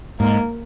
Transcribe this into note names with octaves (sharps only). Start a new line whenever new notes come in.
G#2 A#3